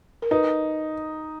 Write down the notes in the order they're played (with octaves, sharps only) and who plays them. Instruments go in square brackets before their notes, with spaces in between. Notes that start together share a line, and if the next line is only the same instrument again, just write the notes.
[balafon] A#4
[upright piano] D#4 [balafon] B4